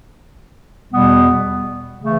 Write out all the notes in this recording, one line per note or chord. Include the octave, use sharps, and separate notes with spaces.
E2 B2 G3 B3
C#3 E3 A3